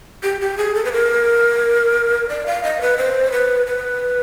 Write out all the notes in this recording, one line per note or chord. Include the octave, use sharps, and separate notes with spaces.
G4
G4
G#4
A4
B4
A#4
D5
F5
D#5
B4
C5
B4
B4